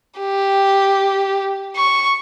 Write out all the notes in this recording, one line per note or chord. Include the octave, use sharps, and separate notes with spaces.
G4
C#6